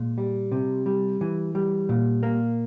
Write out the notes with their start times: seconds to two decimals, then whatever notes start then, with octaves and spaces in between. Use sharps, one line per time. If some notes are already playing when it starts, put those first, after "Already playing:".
Already playing: A#2 G#3
0.18 G3
0.52 C3
0.86 G3
1.21 E3
1.55 G3
1.89 A#2
2.23 A#3